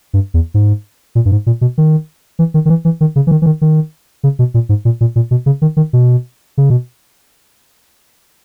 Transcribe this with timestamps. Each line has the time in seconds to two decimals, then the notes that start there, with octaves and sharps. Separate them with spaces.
0.13 G2
0.34 E2
0.54 G#2
1.15 A#2
1.25 G2
1.32 G#2
1.46 A#2
1.61 B2
1.78 D#3
2.39 E3
2.54 D#3
2.66 D#3
2.69 E3
2.85 E3
3.01 D#3
3.16 C#3
3.27 E3
3.31 D#3
3.42 E3
3.46 D#3
3.61 D#3
4.23 C#3
4.39 B2
4.54 A#2
4.69 G#2
4.85 A#2
5.01 A#2
5.16 A#2
5.31 B2
5.46 C#3
5.62 D#3
5.77 D#3
5.93 B2
6.58 C#3
6.70 B2